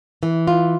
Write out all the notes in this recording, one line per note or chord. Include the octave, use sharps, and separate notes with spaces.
E3
F4